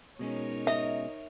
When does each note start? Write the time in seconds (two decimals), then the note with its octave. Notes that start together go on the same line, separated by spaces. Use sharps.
0.19 B2 G#3 C#4 D#4 A#4 C#5
0.67 D#5 E5